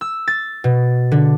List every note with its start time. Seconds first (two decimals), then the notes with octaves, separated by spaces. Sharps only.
0.01 E6
0.28 A6
0.64 B2
1.12 D3